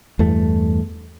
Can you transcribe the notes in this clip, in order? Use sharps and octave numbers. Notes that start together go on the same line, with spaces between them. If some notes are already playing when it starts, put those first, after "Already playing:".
E2 G2 A3